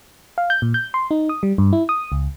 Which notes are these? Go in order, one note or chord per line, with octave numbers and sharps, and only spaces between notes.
F5
G6
A#2
G6
C6
D#4
D#6
G3
G2
E4
D#6
C#2